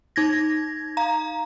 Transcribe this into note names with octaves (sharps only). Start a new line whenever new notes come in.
D#4 G#6 A#6
F5 A#5